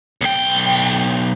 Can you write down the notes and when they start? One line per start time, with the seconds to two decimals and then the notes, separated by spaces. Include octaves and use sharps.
0.21 B1 G5